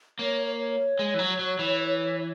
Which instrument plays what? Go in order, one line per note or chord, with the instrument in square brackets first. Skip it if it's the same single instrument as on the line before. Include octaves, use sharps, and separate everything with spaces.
[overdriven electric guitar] A#3 [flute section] C#5
[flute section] C#5
[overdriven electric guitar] G#3
E3
F#3
F#3
E3